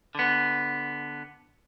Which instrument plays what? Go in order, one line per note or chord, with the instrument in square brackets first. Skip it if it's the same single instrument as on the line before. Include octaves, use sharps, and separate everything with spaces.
[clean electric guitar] D3 B3